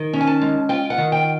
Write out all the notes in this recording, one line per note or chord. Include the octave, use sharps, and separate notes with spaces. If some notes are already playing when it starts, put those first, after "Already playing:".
Already playing: D#3
C#4
G#5
A5
G#3
F4 G5
F#5
D#3
G5